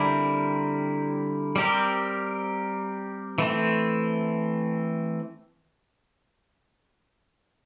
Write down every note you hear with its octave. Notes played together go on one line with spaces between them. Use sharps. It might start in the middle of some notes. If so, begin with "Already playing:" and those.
Already playing: D3 G3 C4 E4 A#4
G3 C4 G4 A#4
E3 A3 C4